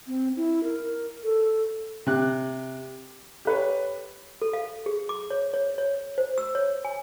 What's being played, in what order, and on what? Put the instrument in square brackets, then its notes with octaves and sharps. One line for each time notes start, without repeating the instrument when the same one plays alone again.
[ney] C4
E4
A#4
A4
[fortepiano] C3 F#6
[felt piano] G4 B4 C#5
[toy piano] A4
F5
G#4
D6
C#5
C#5
C#5
C5
E6
C#5
G#5